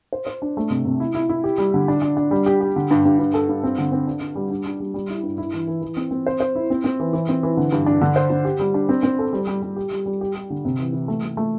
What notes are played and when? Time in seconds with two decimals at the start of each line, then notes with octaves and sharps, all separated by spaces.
0.13 C5
0.27 C5
0.42 D4
0.57 A3
0.70 C3
0.85 C3
1.00 E4
1.15 E4
1.29 E4
1.44 G4
1.58 G3
1.74 D3
1.88 D4
2.02 D4
2.17 D4
2.31 G3
2.46 G4
2.61 G4
2.76 D3
2.91 G2
3.05 G2
3.19 G2
3.34 A4
3.49 G2
3.63 C4
3.78 D3
3.92 C4
4.07 D4
4.21 D4
4.36 G3
4.50 D4
4.66 D4
4.80 G3
4.94 G3
5.10 E4
5.23 G2
5.38 E4
5.53 E3
5.67 E3
5.82 E3
5.97 C4
6.11 C4
6.27 C5
6.40 C5
6.55 E4
6.70 C4
6.84 C4
7.00 E3
7.13 E3
7.29 C4
7.43 E3
7.57 D3
7.72 G2
7.86 D4
8.01 D3
8.16 C5
8.30 D3
8.45 G4
8.60 G3
8.74 D4
8.89 C4
9.03 C4
9.19 A4
9.33 G3
9.47 G3
9.62 G3
9.76 G4
9.91 G3
10.06 G3
10.21 G4
10.35 G4
10.50 D3
10.65 C3
10.79 E3
10.93 E3
11.08 A3
11.23 A3
11.37 A3